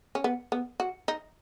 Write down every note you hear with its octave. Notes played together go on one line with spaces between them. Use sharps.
C#4
B3
B3
F#4
D#4